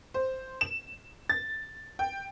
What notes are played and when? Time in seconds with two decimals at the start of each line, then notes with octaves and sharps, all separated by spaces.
0.14 C5
0.61 E7
1.29 A6
1.99 G5